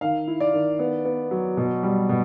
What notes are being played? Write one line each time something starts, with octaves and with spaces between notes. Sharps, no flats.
D#3 F5
E4
D5
D#3
B3
B3
F#3
B2
G3
B2